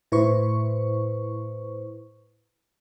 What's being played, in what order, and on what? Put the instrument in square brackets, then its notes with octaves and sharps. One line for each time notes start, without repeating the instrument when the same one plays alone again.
[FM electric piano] A2 E4 B4 C5 C#6